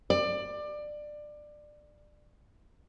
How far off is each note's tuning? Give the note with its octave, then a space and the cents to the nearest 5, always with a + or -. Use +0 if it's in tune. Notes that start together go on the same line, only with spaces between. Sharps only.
D5 +20